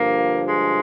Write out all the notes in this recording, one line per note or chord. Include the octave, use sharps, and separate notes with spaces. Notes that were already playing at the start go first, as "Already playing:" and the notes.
Already playing: G2 D3 F3 A#3
G#3